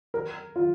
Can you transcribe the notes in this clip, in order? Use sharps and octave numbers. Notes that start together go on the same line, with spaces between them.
A#4
F4